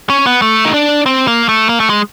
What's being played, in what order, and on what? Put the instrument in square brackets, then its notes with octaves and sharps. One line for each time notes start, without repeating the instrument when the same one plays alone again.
[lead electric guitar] C#4
B3
A3
D#4
D4
C4
A#3
A3
A#3
A3
G#3